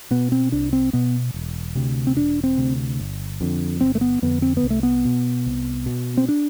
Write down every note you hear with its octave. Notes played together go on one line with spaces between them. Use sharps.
B2 B3
C4
C2 D4
C4
B2 B3
E1
D2 C3
C4
E1 D4
C4
D2 C3
G1
F2 D3
G1 C4
A3
B3
F2 D3 B3
C4
B3
C2
A3
B3
B2
C2
B2
C4
D4